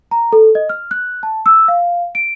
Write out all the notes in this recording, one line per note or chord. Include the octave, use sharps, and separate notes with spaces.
A#5
A4
D#5
F6
F#6
A5
E6
F5
D7